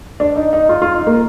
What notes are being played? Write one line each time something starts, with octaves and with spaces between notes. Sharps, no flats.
D4
D#4
D#4
F4
F4
D#4
A#3